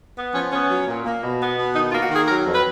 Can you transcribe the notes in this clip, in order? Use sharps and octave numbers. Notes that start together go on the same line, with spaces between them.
B3
F3 C#4
B3 C#4
F#3
A#2
A#3
B2
B3
B2
D#3 D#4
F4
A#3
F#4
D#3
G#4
F#3 A#4
F2
B4